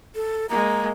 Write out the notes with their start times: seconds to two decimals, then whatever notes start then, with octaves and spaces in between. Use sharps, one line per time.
0.15 A4
0.49 G#3 A#3 A#5